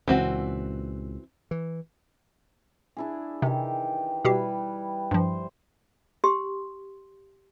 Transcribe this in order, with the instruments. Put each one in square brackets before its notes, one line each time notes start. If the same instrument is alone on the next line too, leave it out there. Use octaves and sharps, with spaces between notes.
[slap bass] C#2 A#2 [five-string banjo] E3 C4 F#4
[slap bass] E3
[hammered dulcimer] D4 E4 G#4
[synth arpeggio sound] C3 [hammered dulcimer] D#3 E3 G4
[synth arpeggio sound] B2 G4 C7 [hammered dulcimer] G3 E4 B4
[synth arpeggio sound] G2 F3 [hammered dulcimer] C5
[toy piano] G4 C6